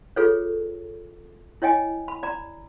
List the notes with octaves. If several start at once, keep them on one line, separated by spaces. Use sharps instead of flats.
F4 G#4 A4 B4 C#5
E4 C#5 D#5 G5 G#5
B5
D5 A#5 B5